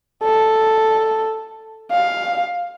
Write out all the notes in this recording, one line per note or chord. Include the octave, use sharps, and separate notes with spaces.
A4
F5